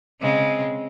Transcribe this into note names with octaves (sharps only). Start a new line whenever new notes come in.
C#3 G#3 C4